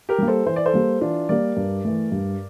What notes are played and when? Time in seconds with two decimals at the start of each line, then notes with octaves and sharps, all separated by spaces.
0.09 G4 A#4
0.18 G3 A#3
0.28 A4 C5
0.46 E3 C5
0.56 D5
0.65 A4 C5
0.74 G3 A#3
1.01 E3 D4 F4
1.29 G3 A#3 A#4 D5
1.57 G2
1.84 E3 A3
2.12 G2